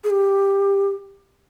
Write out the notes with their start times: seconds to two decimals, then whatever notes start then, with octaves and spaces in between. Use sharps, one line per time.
0.04 G#4
0.10 G4